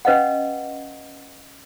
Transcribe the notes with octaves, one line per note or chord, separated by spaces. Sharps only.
C#4 B4 D#5 F5 F#5